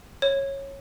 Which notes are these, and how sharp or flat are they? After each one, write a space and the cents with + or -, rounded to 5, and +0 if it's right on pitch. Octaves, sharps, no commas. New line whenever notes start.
C#5 -15